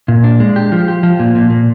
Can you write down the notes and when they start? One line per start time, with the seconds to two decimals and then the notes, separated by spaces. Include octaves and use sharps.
0.08 A#2
0.24 D4
0.40 G#3
0.56 G4
0.72 F3
0.88 G4
1.03 F3
1.20 A#2
1.35 A#2
1.50 A#2